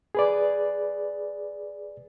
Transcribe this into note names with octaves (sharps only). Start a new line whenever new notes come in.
G#4 B4 D5